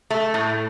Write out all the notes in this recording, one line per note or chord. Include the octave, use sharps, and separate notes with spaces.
A3
A2